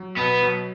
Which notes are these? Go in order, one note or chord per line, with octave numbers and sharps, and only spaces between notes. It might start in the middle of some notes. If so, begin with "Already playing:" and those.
Already playing: F#3
B2 B3
F#3